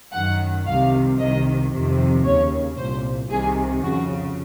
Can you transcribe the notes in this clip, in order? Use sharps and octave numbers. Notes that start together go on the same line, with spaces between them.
F#2 D#3 F#5
C2 C3 D#3 F5
C2 C3 D#3 D#5
F2 C3 D#3
D#2 C#3 C#5
C2 A#2 C5
C2 C3 D#3 G#4
F2 C#3 F#4